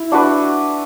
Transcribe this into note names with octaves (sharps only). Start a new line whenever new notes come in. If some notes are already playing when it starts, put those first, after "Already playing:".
Already playing: E4
D4 F#4 B4